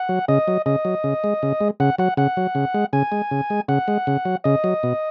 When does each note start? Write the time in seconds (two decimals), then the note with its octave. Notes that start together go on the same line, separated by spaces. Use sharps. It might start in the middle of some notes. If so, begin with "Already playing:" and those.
Already playing: F#5
0.09 F#3
0.28 C#3 D#5
0.48 F#3
0.66 C#3 D#5
0.85 F#3
1.04 C#3
1.24 G#3
1.43 C#3
1.61 G#3
1.80 C#3 F#5
1.98 F#3 F#5
2.17 C#3 F#5
2.37 F#3
2.55 C#3
2.74 G#3
2.93 C#3 G#5
3.12 G#3
3.31 C#3
3.50 G#3
3.69 C#3 F#5
3.88 G#3
4.07 C#3
4.25 F#3
4.44 C#3 D#5
4.64 F#3
4.83 B2